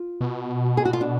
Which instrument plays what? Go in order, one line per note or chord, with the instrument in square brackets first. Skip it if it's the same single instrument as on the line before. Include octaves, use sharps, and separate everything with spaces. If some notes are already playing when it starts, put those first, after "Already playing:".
Already playing: [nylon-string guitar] F4
[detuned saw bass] B2
[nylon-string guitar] G#4
F#4
F4
D4